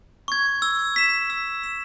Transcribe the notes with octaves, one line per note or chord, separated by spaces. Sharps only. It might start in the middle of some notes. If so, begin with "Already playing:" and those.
C#6 G#6
E6
B6 E7
E6
B6 E7